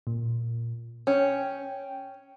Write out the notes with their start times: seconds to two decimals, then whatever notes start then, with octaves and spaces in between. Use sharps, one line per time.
0.07 A#2
1.07 C#4 G5